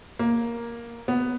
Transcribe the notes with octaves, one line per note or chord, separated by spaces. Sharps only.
A#3
B3